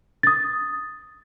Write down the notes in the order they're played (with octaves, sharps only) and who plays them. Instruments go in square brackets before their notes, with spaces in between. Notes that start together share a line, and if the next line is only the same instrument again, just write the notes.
[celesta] D#6 A6